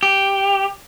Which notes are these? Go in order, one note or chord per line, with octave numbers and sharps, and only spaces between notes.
G4